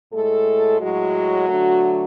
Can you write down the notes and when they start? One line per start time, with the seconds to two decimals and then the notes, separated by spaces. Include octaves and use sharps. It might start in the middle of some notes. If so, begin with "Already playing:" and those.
0.12 A2 G#3 A3 A4
0.80 A2 F#3 G#3 F#4
1.48 D3 A3